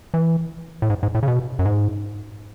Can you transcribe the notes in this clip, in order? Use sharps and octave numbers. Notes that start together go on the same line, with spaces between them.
E3
A2
G#2
G#2
A2
C#3
B2
F#2
G#2